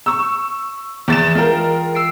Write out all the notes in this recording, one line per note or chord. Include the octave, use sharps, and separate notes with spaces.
C#6 E6
E2 E3 A6 E7
G#3 F4 A#4 G5
E6 C7 D7